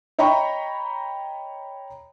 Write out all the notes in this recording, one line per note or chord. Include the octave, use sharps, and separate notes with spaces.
C#5 D#5 G5 A#5 B5 C#6